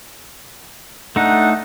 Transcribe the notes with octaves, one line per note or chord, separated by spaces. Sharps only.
A3 D4 D#4 F#5